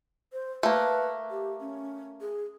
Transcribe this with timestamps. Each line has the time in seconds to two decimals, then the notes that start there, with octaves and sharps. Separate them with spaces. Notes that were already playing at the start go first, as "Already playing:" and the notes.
0.33 C5
0.63 A3 A#3 B4
1.31 G4
1.60 C#4
2.21 G#4